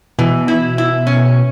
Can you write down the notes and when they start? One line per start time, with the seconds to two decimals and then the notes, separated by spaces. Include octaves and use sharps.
0.19 B2 E3
0.48 E4
0.78 E4
1.07 C#4